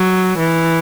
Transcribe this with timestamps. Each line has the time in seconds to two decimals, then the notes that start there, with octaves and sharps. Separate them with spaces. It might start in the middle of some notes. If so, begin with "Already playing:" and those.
Already playing: F#3
0.38 E3